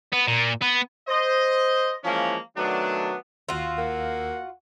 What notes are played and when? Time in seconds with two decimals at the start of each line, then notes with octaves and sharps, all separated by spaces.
0.13 B3
0.27 A#2
0.62 B3
1.08 C5 D#5
2.04 E3 F3 G#3 A#3 C#4
2.57 D#3 F#3 A3 B3 D4
3.49 D#2 F4 F#4 E6
3.78 A#3 F#5